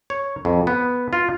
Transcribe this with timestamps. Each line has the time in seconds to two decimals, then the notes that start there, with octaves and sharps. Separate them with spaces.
0.10 C#5
0.45 F2
0.67 B3
1.13 F4